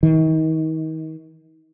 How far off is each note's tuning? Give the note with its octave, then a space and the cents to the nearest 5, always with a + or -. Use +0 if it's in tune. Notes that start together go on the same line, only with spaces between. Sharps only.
D#3 +35